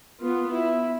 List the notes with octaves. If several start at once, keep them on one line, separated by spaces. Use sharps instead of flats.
B3 F4
E4